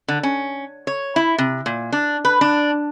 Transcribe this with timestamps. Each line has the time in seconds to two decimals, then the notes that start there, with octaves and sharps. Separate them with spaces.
0.08 D3
0.23 C#4
0.87 C#5
1.16 E4
1.38 C3
1.66 A#2
1.92 D4
2.25 B4
2.41 D4